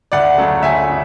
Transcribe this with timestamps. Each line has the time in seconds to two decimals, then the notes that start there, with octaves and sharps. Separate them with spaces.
0.12 D2 D5 F#5
0.38 C#3 F#3 A3
0.63 D2 E5 G#5
0.89 C#3